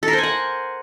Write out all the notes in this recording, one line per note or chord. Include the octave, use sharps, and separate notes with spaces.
A4
A#4
C5
G#5
F#5